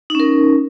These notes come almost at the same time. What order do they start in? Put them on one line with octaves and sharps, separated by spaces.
D#4 C#4 A#4